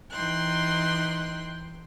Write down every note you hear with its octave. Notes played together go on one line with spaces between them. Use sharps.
E3 D#4 G5 C6 F#6